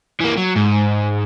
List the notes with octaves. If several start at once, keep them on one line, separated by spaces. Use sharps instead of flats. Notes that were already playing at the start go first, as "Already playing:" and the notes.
E3 A#3
F#3
G#2